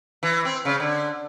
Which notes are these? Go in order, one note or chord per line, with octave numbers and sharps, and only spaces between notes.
E3
C4
C#3
D3